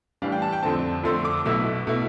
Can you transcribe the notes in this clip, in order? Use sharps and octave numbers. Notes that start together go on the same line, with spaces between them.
A2 E3 G3 D4 F5
G5
A5
G5
F2 D3 A3 C4 A5
F2 D3 A3 C4 C6
D6
B1 B2 A3 E4 E6
B2 A3 E4